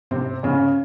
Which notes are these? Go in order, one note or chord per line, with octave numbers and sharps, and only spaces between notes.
C3 C4
C#3 C#4